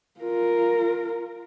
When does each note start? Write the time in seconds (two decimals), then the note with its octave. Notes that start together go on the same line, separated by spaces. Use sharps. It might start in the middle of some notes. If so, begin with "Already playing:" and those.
0.20 F4 A#4